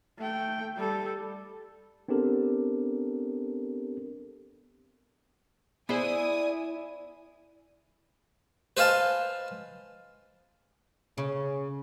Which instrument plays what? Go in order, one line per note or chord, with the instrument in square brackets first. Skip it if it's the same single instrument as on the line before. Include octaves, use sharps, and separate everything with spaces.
[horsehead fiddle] A3 G5
G3 A4
[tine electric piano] B3 C4 D4 G4 A4 A#4
[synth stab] B3 G#4 C5 [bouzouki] E4 [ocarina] D5 [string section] G#5 D#6
[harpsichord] B4 C5 D#5 F5 G#5 A5
[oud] C#3 [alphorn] C#4